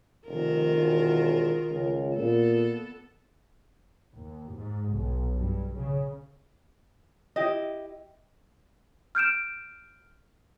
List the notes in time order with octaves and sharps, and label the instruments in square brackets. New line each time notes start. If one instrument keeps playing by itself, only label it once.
[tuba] F1 [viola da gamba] D#3 F4 A#4
[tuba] E1
C#2
[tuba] A#2 [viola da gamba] B3 A4
[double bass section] D#2
G#2
B1
G2
C#3
[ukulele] E4 G4 D#5
[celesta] F6 G6 D7 E7